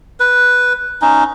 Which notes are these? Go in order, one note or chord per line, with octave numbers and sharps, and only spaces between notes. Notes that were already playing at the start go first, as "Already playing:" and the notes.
B4
C#4 D#4